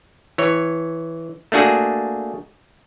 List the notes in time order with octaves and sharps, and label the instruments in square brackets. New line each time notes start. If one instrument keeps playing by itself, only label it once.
[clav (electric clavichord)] E3 C#5
A3 A#3 D4 F#4 G#4